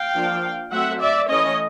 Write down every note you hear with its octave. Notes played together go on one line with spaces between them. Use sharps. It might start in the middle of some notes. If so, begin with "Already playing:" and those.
Already playing: F5 G5
F3 A#3 D4
F#3 A3 C4 E5 F#5
D5 E5
E3 A3 C#4 C#5 D#5